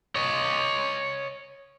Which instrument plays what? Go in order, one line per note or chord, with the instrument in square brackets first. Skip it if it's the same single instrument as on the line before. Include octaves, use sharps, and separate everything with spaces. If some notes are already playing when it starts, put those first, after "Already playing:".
[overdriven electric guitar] C#5 D#5